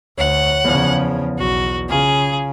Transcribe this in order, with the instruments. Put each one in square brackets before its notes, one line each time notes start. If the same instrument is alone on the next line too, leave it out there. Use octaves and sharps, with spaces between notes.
[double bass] D2 [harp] C#5 [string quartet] F#5
[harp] E2 [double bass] C#3 F3
[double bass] B1 [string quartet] F#4
[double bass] C#3 [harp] F4 [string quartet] G#4